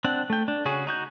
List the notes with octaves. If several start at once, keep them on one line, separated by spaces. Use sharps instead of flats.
C4 D4 F#5
A3 G5
D4
C#3 C#4 F#4 G#4
D#4 F#4 G6